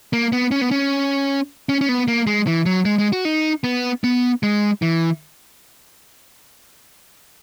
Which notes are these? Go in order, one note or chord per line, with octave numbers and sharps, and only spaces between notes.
A#3
B3
C#4
B3
C#4
C#4
C#4
B3
A#3
G#3
E3
F#3
G#3
G#3
F#4
D#4
B3
B3
G#3
E3